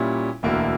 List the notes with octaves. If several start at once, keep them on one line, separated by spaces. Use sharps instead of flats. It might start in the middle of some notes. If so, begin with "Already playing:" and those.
Already playing: A#2 G3 C#4 E4
E1 D2 D3 A#3 E4